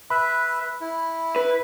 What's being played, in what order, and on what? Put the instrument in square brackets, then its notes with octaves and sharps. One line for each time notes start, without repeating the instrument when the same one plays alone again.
[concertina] B4 E5 [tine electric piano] B5
[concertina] E4
[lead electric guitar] B4